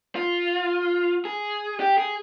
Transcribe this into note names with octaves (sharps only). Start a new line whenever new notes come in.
F4
G#4
G4
G#4